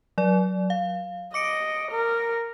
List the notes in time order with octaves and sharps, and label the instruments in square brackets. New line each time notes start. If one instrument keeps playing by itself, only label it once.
[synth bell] F#3 D5
F5
[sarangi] D#5 [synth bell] D6 C#7 D7
[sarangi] A#4